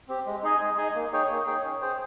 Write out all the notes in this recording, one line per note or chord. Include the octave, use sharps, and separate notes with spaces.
C4 G4
G#3
D#4 G#4 D#5 G#5
G#3
D#4 G#4 D#5 G#5
A#3
D#4 G#4 C#5 G5
A#3
D#4 G#4 C#5 G5
C#4
G#4 C5 G5